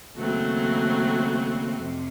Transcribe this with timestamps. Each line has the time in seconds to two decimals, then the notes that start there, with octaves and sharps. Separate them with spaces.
0.16 D#2 C#3 F#3 A3 C4
1.78 F2 C3